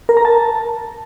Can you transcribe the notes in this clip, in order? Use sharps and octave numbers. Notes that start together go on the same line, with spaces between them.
A#4
A#5
A5